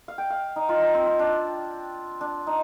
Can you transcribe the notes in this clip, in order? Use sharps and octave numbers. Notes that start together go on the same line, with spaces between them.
F5
G5
F5
D#4
F4
D#4
C4
C4
D4
D4
D#4